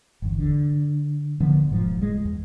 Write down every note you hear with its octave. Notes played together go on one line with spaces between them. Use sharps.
G1 E2
D3
D3 F3 B3
E1 G#2 F3
C#2 G#3
E2